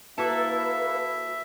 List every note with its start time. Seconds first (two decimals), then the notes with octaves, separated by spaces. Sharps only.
0.18 A#3 E4 F#4 A4 B4 E5 A5